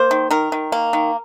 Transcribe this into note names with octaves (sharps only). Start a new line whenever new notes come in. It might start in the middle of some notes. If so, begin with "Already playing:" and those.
Already playing: A#3 C5
D#3
D#3 A#4
D#3
A#3
D#3